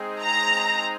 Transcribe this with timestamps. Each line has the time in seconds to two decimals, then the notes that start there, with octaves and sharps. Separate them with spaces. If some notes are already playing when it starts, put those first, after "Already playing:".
Already playing: G#3 C4 D#4 G#4
0.22 A#5